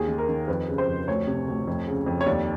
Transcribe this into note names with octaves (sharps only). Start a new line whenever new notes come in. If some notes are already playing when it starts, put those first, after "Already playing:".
Already playing: D#2 G#4
D#3
A#4
D#3
F2 B4
C#3
C5
F2
D2 C#5
C3
D2
F2
C#3
F2
C#5
D#2 D5